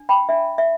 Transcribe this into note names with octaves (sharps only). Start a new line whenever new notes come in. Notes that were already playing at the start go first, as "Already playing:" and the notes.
Already playing: D4
G5 B5
D4 E5
E5